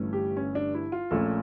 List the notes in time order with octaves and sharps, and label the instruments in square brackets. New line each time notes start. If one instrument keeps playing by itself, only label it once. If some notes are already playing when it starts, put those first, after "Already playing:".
Already playing: [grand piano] G1 G2 E3 A3 C#4
G4
C#4
D4
E4
F4
A#1 A#2 A3 C#4 A4